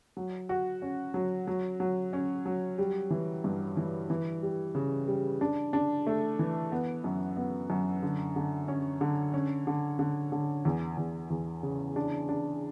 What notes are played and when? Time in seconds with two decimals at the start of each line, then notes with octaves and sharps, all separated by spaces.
0.17 F#3
0.49 F#4
0.82 C#4
1.14 F#3
1.47 F#3
1.80 F#3
2.13 C#4
2.46 F#3
2.78 G3
3.10 E3
3.44 G2
3.77 E3
4.10 E3
4.43 G3
4.75 C#3
5.08 G3
5.41 D4
5.73 D4
6.07 A3
6.39 E3
6.72 B3
7.04 F#2
7.37 B3
7.70 F#2
8.03 D3
8.36 D3
8.68 C#4
9.01 D3
9.34 C#4
9.67 D3
9.99 D3
10.32 D3
10.65 E2
10.97 E2
11.30 E2
11.63 C#3
11.96 D4
12.29 D4